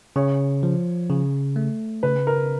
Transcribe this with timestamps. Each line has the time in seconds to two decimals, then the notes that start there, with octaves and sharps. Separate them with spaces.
0.16 C#3 C#5
0.63 F3
1.10 C#3
1.56 A3
2.03 C#3 B4
2.27 A#4